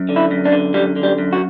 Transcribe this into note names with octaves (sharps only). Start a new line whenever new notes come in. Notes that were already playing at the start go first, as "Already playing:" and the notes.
Already playing: F#2
D3
E4
F#2
D4
D3
F#2 G3
D3
G3
F#2
F#4